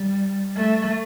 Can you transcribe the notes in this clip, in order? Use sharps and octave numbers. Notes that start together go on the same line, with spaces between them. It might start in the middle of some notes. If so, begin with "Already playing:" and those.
Already playing: G3
A3